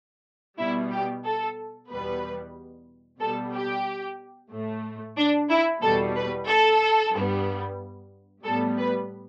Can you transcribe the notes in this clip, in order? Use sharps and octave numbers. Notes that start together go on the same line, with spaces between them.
B2 G3 B3 E4
G4
A4
E2 B2 G3 B3 B4
B2 G3 B3 A4
G4
A2 A3
D4
E4
E2 B2 G3 A4
B4
A4
G2 G3 B3
A2 G3 B3 A4
B4